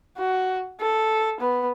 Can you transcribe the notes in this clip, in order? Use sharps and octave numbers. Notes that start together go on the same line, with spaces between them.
F#4
A4
B3